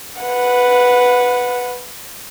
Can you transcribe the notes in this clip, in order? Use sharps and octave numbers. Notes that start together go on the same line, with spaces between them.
B4 F#5